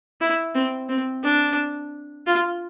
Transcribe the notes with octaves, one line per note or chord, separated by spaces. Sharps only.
E4
C4
C4
D4
F4